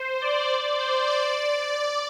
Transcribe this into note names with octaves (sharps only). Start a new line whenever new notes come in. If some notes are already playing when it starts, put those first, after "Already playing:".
Already playing: C5
D5
D5
C5
D5